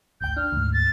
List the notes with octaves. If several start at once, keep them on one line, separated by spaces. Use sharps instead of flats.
G#1 D2 G5 G6
D4 F6
D2 G#2
A6